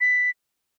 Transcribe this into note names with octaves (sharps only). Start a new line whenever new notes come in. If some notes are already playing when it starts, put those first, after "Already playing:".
B6